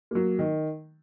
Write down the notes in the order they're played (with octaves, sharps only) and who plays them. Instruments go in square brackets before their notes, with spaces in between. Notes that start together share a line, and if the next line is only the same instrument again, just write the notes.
[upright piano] F#3 A#3
D#3